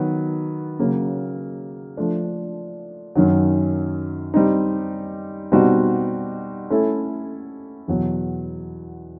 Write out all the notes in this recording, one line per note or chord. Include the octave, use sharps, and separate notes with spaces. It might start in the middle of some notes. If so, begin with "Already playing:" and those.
Already playing: D#3 F#3 B3
C#3 F#3 A#3
F3 A3 D4
F#2 D#3 F#3
G3 C4 D#4
B2 G3 C4 D#4 F#4
A3 C#4 E4 A4
E2 B2 F#3